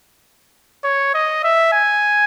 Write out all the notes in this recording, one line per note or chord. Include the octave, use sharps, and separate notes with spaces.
C#5
D#5
E5
G#5